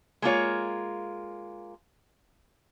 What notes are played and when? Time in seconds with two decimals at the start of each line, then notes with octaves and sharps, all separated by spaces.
0.22 G#3 A#3 F4 C#5